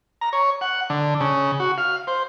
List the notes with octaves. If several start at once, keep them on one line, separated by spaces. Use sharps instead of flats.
A#5
C#5
F#5
D3
C#3
F#4
F5
C5